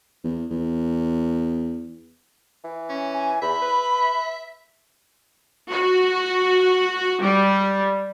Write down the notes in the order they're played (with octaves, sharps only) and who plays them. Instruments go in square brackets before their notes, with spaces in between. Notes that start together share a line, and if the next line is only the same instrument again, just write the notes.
[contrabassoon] E2
E2
[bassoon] E3
[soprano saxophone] C#4
[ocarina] G#5
[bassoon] E2 [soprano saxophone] E5 [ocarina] B5
[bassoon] B4
[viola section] F#4
G3